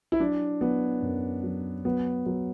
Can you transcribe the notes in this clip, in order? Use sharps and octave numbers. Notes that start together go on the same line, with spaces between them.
E4
F#3 D4
F#3 B3
F#2
F#3
F#3 B3
F#3